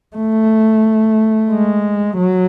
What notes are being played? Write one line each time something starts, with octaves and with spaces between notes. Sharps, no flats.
A3
G#3
F#3